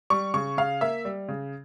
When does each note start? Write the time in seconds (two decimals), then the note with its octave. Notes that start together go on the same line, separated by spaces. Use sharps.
0.10 G3 C#6
0.34 C#3 C#6
0.57 C#3 F5
0.81 A#3 E5
1.05 G3
1.29 C#3